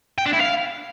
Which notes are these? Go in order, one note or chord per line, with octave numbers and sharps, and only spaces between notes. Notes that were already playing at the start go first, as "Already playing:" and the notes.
G5
D4
E4
F5